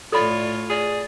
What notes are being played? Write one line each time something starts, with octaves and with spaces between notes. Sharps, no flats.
A2 F4 A4 C#5 D5 B5
G#4 D5